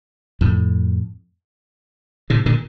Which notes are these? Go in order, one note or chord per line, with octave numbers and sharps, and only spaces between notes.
F2 A2
A2 C3
A#2 D3